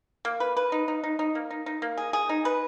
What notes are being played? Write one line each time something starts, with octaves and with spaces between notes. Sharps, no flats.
A#3
B4
B4
D#4
D#4
D#4
D#4
A#3
D#4
D#4
A#3
G#4
G#4
D#4
B4